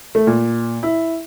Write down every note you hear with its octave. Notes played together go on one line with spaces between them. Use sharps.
A3
A#2
E4